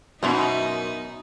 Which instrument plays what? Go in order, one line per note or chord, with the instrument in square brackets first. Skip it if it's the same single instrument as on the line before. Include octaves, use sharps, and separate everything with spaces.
[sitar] F#2 [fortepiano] B2 [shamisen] B3 E4 C5 [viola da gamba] D#4